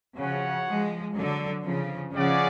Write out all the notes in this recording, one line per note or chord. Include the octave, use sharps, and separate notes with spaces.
C#3 F3 F#4 C#5 F#5
F3 G#3
D3 F#3
C#3 F3
C#3 F3 C#4 G#4 D5 F#5